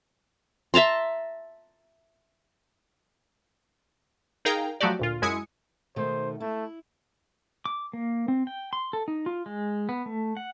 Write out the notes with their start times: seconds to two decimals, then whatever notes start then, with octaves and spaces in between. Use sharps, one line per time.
0.74 E5 A5 A#5 C6
4.45 D#4 G#4 A#4 F5 G5 A#5
4.80 F3 F#3 A3 F#4 G4 D5
4.99 D2 A#2 F4
5.22 F#2 G#3 E4 G#5 D#6 C#7
5.96 B2 D#3 A3 C5
6.40 A3 E4
7.65 D6
7.93 A#3
8.28 C4
8.47 G5
8.73 C6
8.93 A4
9.08 D#4
9.26 F4
9.46 G#3
9.89 B3
10.06 A3
10.37 F#5